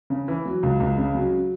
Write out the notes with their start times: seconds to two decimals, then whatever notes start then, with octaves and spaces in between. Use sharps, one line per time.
0.10 C#3
0.28 E3
0.45 F#3
0.63 C#2
0.80 C#2
0.98 C#3
1.14 F#3